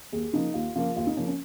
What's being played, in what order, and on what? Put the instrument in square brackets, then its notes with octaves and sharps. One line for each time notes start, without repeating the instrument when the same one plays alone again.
[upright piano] D#2 G#4
C#3 F3 A#3 D#4
D#2 F4
C#3 F3 A#3 F4
D#2 F4
D#4
C#3 F3 A#3 C#4
C#4